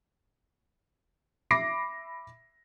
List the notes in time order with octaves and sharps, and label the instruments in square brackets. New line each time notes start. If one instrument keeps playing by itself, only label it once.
[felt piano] E5 B5 D6 A#6 C7 D7